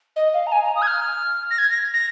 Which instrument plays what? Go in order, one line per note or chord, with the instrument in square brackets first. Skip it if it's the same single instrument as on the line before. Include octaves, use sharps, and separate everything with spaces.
[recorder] D#5
F5
A#5
G#5
A#5
D#6
G#6
F6
A#6
G#6
A#6
A#6